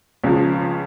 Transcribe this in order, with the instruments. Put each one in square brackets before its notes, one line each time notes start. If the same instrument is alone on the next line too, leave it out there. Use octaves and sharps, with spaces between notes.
[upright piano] C#2 C#3 F3